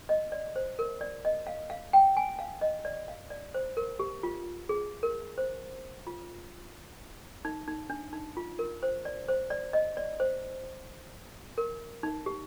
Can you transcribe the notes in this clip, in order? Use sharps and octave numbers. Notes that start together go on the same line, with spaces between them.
D#5
D5
C5
A#4
D5
D#5
F5
F5
G5
G#5
F5
D#5
D5
F5
D5
C5
A#4
G4
F4
G#4
A#4
C5
F4
D#4
D#4
D4
D#4
F4
A#4
C5
D5
C5
D5
D#5
D5
C5
A#4
D#4
G4